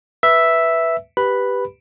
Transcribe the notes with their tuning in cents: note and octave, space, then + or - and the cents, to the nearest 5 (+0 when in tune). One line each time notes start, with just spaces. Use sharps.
B4 -5 E5 +0
G4 +0 B4 +0 B5 +0